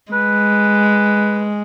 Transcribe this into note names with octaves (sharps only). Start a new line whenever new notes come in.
G#3 B4